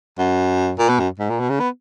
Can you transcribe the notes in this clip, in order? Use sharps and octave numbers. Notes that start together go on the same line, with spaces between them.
F#2
A#2
B2
F#2
G#2
A#2
B2
C#3
B3